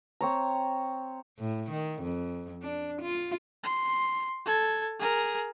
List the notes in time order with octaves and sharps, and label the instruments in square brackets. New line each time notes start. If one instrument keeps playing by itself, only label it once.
[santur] C4 C#5 A#5
[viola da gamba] A2
D#3
F2
D4
F4
[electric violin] C6
A4 G#6
G#4 A#4